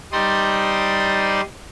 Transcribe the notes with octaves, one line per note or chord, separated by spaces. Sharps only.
G3 D#4 C5 D5 C6 D#6